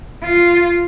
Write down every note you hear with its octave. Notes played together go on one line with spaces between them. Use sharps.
F4